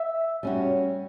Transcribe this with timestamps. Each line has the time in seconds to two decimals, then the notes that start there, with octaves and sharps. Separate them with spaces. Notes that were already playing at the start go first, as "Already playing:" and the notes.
Already playing: E5
0.43 G3 C#4 F#4